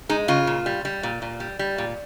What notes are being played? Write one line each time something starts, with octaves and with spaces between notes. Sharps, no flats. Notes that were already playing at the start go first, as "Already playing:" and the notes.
G#3 D#4
C#3 F4
A#2
G3
G3
A#2
A#2
G3
G3
A#2